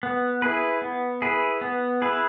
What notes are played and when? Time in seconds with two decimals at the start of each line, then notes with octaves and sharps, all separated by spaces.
0.03 B3
0.42 E4 G#4 B4
0.82 B3
1.22 E4 G#4 B4
1.61 B3
2.02 E4 G#4 B4